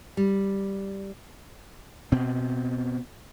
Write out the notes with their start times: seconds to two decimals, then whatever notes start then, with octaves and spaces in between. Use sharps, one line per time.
0.17 G3
2.12 B2 C4